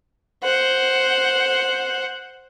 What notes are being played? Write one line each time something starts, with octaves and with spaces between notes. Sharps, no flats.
C5 F#5